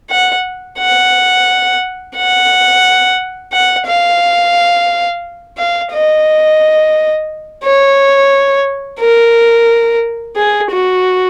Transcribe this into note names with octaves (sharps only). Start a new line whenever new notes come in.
F#5
F#5
F#5
F#5
F5
F5
D#5
C#5
A#4
G#4
F#4